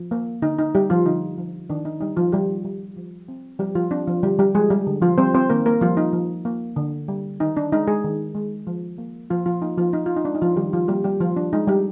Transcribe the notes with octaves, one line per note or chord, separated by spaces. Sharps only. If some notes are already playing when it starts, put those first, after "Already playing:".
Already playing: F3
A#3
D3 D#4
D#4
G3 G4
F3 F4
D3 D#4
F3
D#3 D4
D#4
G3 D#4
F3 F4
D#3 G3 G4
G3
F3
C4
F3 G3 G4
F3 F4
C4 D4
F3 F4
D3 G3 G4
G3 G4
F3 G#3 G#4
G3 G4
D3
F3 F4
G3 C4 C5
C4 C5
D#3 A#3 A#4
A#3 A#4
F3 G3 F4
D#4
F3
A#3
D3
G3
D#3 D#4
D4
G#3 D#4
G#3 G#4
D#3
G#3
F3
A#3
F3 F4
F3 F4
A#3 D#4
F3 F4
F3 D#4
F4
D#4
G#3 D4
D#4
F3 F4
D#3 G3 G4
F3 F4
G3 A#3 G4
G3 G4
D#3 F3 F4
D4
G#3 D#4
G3 G4